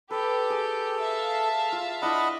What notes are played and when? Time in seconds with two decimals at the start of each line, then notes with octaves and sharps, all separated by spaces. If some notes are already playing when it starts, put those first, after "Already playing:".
0.11 G4 A4 B4
0.50 G#4
1.01 E5 F5 A5
1.72 F4
2.02 D4 E4 D#5 F#5 B5